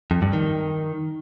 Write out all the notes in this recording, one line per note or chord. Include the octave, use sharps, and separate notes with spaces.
F2
G2
D#3